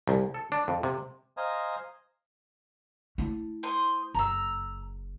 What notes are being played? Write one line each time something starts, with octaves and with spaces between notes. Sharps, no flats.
C2
A4
D4
F2
C3
C5 D#5 F5 G#5 A#5
A3 E4
C5 C6 D#6
F#1 A#5 E6